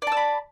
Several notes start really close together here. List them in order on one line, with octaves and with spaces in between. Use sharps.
D5 A5 E6 B5